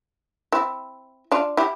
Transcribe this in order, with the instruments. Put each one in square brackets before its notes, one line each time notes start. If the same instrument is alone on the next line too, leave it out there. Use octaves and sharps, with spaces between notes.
[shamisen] C4 E4
D4 F4
E4 G4